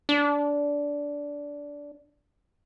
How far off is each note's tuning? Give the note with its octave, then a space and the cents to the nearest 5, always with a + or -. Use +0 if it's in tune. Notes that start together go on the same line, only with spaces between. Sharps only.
D4 -15